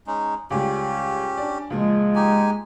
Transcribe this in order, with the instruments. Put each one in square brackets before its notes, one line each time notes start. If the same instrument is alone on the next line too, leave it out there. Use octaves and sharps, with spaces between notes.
[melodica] G#3 C#4 D#4
[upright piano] C#2 G3 [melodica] C#4 G4
[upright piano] D4 D5
[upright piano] C#2 A#2 F3 [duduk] G#3
[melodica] D#4 G4 G#5